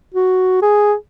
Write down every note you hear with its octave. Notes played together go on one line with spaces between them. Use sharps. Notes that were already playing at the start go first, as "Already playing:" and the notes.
F#4
G#4